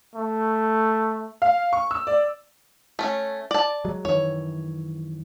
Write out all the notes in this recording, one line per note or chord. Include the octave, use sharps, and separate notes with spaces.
A3
F5
C#6
E6
D5
A3 C#4
D5 A5
F#3 G#3
F#2 D#3 E3 C#5